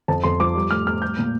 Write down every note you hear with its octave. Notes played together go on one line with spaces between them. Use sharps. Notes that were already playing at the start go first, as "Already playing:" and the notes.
F2 A5
F2 C6
F3 D6
G3
A2 F6
A2 F6
G3 G6
A#2